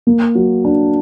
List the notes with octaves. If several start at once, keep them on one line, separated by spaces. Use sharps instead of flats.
A#3
F#3
D4